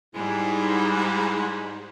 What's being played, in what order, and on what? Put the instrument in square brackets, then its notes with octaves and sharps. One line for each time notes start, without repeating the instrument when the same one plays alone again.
[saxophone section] G#2 [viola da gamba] G3 [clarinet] E4